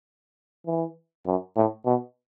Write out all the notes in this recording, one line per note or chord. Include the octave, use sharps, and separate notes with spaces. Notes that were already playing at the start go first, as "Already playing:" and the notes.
E3
F#2
A2
B2